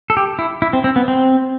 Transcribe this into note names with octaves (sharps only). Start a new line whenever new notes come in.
A4
G4
E4
E4
C4
C4
B3
C4